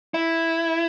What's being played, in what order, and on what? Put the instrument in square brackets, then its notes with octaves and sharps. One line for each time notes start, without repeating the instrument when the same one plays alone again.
[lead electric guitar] E4